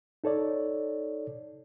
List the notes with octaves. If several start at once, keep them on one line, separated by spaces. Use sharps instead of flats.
D#4 A4 C#5 D5